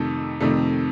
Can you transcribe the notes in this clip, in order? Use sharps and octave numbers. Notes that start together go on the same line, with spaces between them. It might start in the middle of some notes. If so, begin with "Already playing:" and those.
Already playing: F2 C3 D#3 A3 A4
F2 C3 D#3 A3